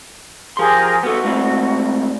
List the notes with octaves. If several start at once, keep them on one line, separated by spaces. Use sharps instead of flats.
F3 G4 G#4 A#4 C6
B3 F#4 A4
G#2 A3 C4